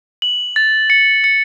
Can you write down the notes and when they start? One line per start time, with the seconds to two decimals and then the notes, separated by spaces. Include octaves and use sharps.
0.22 F#7
0.56 A6
0.90 C#7
1.24 C#7